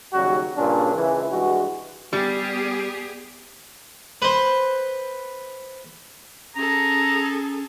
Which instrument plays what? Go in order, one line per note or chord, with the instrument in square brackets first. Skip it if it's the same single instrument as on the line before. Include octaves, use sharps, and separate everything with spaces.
[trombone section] D#2 C#3 F#3 G3 F#4
G2 A#2 C#3 C#4 D4
C#2 E3
G2 E3 G#3 F#4
[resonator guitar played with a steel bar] G3 [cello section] B3 G4 G#4
[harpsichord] B4 C5
[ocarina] C#4 [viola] G#4 A4 [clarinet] A#5